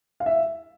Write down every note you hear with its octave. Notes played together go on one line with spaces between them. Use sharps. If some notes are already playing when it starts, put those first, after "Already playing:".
F5
E5